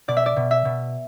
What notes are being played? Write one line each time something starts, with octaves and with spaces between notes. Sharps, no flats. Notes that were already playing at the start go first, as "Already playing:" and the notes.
B2 D5
E5
D5
B2
E5
B2